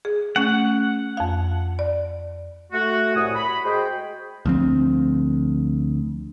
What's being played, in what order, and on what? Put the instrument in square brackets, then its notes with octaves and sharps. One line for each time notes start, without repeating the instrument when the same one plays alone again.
[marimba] G#4
[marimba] A3 C#4 [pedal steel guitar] F#5
[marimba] F2 F5
D5
[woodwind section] A3 F#4
C2 A2 F#5 G#5 D#6
B5
G#3 F#4 G#4 C5 D#5 G5
[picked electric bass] D2 F3 C4